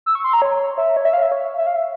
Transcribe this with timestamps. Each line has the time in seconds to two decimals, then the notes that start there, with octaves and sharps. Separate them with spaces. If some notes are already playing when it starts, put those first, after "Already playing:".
0.06 E6
0.15 C#6
0.24 C6
0.33 A#5
0.42 C#5
0.78 E5
0.97 C#5
1.05 E5
1.13 F5
1.22 E5
1.32 C#5
1.58 E5
1.67 F5
1.76 E5